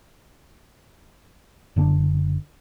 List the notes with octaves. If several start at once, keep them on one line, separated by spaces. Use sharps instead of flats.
F#1 D3 C4 D4